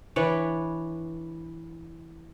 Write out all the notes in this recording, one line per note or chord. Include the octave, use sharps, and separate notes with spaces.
E3 D4 B4 C#5